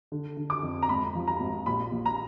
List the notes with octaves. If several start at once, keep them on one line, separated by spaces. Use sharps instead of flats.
D3
D3
D6
F2
A#5
G#1 B5
F3
A#5
G#1
A#1 B5
A#1
A#5